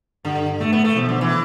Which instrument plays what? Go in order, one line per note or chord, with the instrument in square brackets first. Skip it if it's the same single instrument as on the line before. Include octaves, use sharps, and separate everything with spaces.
[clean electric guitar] G2 [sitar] D3
[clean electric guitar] A2 [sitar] A3
[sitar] B3
A3
[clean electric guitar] B1 B2 [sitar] F3
[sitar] D3
E3